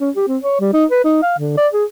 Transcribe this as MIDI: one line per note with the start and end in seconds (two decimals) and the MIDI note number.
0.01 0.10 61
0.16 0.26 67
0.28 0.37 60
0.43 0.59 73
0.60 0.72 55
0.73 0.85 63
0.91 1.02 71
1.04 1.21 63
1.22 1.38 77
1.39 1.55 50
1.57 1.68 74
1.73 1.84 68